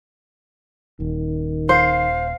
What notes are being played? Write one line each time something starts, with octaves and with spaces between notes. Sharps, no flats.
D#1 D#3
C5 F5